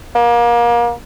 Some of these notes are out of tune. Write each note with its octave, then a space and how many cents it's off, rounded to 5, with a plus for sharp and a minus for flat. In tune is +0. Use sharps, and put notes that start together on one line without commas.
A#3 +30